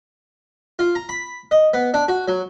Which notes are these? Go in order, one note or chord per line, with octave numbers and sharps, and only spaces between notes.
F4
A#5
B5
D#5
B3
D4
F#4
F#3